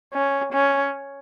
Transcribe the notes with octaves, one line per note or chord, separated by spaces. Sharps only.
C#4
C#4